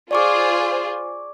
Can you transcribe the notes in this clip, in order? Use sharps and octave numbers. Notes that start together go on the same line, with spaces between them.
F4 G#4 C5 D5 C#6 D6